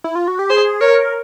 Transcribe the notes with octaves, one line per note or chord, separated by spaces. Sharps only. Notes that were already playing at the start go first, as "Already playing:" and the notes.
E4
F4
F#4
G4
G#4 C5
A#4 C#5